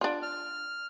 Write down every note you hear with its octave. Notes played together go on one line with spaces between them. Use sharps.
D4 F4
F6